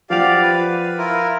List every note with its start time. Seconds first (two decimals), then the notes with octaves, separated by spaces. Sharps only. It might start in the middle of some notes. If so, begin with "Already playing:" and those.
0.10 F3 G4 D5 F5 F#5 F7
0.42 B4
0.98 E4 F4 A#4